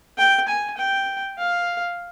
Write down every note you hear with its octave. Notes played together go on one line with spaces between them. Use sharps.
G5
G#5
G5
F5